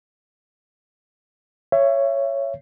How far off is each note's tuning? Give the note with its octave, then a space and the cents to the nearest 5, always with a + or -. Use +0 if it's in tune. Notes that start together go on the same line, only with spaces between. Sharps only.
C#5 +0 E5 +30